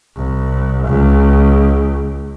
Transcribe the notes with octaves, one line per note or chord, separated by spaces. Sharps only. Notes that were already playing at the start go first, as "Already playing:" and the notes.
C2
C#2